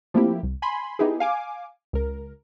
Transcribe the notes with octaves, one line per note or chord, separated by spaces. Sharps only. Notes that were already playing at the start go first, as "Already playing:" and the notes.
F3 A3 A#3 C4 E4 G4
C2
G#5 B5 C6
B3 D#4 E4 G4 G#4
F5 G#5 D6
C#2 A#4